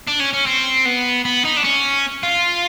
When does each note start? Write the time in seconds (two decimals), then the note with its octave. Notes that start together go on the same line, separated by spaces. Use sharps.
0.08 D4
0.20 C#4
0.34 C#4
0.47 C4
0.86 B3
1.25 B3
1.45 D#4
1.57 D4
1.64 C#4
2.23 F4